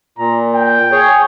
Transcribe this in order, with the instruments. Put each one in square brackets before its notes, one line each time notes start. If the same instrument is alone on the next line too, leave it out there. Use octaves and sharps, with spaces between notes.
[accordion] A#2 [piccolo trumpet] A#5
[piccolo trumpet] G5
[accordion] G#4 C#5